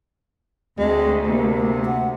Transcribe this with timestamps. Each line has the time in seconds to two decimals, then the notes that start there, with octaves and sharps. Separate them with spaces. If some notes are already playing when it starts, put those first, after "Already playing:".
0.79 D2 G#3 C4
1.27 C3 A#3
1.85 F#5